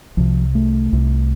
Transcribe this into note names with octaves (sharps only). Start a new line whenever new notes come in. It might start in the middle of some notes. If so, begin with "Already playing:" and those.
C2 C3 F3
A3
C2 C3